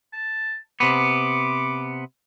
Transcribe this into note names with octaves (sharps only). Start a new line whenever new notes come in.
A5
C3 B3 D6